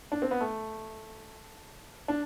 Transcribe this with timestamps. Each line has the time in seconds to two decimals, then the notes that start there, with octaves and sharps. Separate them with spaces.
0.12 D4
0.22 C4
0.31 B3
0.41 A3
2.08 D4